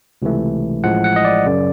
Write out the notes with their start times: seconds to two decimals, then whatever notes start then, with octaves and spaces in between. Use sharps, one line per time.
0.22 C#2 C3 E3 A3
0.84 A1 A2 F3 G#3 F#5
1.04 F#5
1.16 D#5
1.25 D5
1.46 F#2 C#3